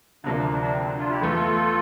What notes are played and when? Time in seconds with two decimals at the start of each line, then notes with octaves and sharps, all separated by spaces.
0.24 D2 C3 F3 A#3 D4
0.37 D4
0.49 D4
0.61 D4
0.73 C4
0.85 D4
0.98 D4 F4
1.10 E4 G4
1.21 E2 E3 A3 F4 A4